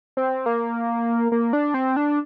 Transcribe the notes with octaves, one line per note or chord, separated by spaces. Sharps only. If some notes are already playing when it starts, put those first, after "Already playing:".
C4
A#3
A#3
D4
C4
D4